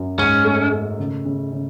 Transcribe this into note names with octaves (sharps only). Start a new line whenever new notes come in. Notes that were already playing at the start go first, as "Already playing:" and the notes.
Already playing: F#2
G#2 C#4
A3
A3
C#3
C#3
C#3